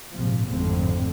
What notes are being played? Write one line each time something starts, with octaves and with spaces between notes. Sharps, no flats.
A#1 G#2 C3 F3
G#1 F2 A2 D3 C4